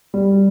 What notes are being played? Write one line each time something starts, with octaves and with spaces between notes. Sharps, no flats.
G3